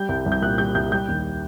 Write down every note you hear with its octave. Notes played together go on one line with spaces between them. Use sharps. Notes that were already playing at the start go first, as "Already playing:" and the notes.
Already playing: G3 G6
C2
C2
G6
A#2 F#6
G3 G6
C2 G6
G3 G6
D#2